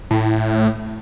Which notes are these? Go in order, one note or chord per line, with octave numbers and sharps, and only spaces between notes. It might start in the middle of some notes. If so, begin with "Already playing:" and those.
A2